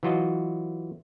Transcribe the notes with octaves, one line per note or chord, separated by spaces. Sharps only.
E3 F#3 F4 F#4 D#5